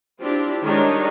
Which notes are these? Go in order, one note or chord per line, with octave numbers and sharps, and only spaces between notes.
C4 D4 E4 F4 G4
D#3 G3 G#3 D4 D#4 C#5